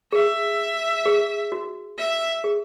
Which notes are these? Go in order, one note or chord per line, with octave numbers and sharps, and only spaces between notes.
G#4 E5
G#4
F#4
E5
G#4